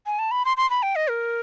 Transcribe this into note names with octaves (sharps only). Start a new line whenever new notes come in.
G#5
A5
B5
C6
C6
B5
G5
D#5
A#4